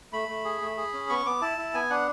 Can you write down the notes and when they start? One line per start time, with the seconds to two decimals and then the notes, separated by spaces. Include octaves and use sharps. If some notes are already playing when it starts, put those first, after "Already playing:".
0.13 A3 B5
0.29 A3
0.45 G#4
0.62 A3
0.77 G#4
0.93 C#4
1.09 B3 C#6
1.26 B3 D6
1.41 E4 A5
1.58 E4
1.74 B3 G#5
1.90 D4 F#5